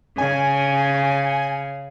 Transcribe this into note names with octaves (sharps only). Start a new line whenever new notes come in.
C#3 G#5